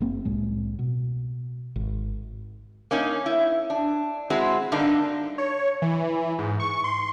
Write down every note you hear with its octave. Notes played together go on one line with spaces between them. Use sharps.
F#1 A#3 C4
C2 A2 G#3
B2
G#1
A#3 C#4 D#4
E4
D4
G#3 C4 E4 F#4 G#4
G2 D3 A#3 D4 D#4
C#5
E3
G#2
C#6
C6